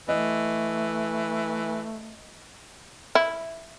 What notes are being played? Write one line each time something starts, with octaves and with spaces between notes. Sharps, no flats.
E3 A3 D#5
E4